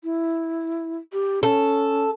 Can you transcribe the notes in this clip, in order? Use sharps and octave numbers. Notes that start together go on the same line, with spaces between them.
E4
G4
C#4 A4